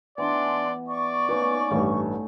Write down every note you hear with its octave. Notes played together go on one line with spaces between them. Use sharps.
E3 B3 D4 D5 C6
D5 C#6
A#3 B3 C#4 D#4
A1 G2 A3